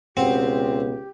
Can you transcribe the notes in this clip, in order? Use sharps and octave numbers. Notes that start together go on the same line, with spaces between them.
C#2 B2 C4 G4 F#5